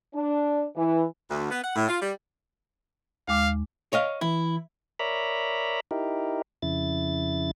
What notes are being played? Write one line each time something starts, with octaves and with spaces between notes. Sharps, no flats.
D4
E3
D2
B3
F#5
A2
F4
G3
D#2 G#3 F5 D6
C#5 D#5 F5
E3 E4
A#4 C#5 D5 E5 A#5 B5
D#4 E4 G4 A#4
F2 C#3 E4 A6